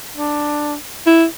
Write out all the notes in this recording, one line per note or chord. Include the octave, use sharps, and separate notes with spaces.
D4
E4